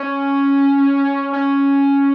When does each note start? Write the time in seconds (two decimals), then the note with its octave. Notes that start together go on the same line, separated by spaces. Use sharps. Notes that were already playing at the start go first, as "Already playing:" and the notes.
Already playing: C#4
1.33 C#4